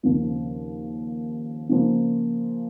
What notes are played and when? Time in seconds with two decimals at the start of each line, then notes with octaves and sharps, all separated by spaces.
0.03 D#2 C#3 F3 C4
1.69 C#3 F3 A#3